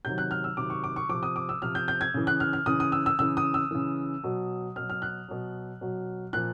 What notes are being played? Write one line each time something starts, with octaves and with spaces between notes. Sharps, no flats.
C3 D#3 F#3 G6
F#6
F6
E6
C3 D#3 F#3 D6
C#6
D6
C#6
C3 F3 D6
D#6
D6
E6
C3 F3 F6
G6
G6
G#6
C#3 E3
F#6
F6
F6
C#3 E3 D#6
D#6
E6
E6
C#3 E3 E6
D#6
E6
C#3 E3
B2 F#3
B2 F#3 F6
F6
F#6
B2 F#3
B2 F#3
A#2 F3 F#6